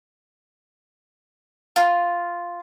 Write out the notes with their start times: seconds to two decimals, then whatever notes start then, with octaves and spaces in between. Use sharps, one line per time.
1.76 F4